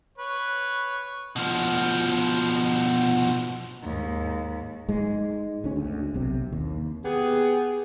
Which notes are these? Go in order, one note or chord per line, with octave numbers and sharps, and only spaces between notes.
B4 C#5
B2 F3
D#2 G#2
G#2 G#3
D2 C#4
D2
B1 C3
D#2
B3 G4 G#4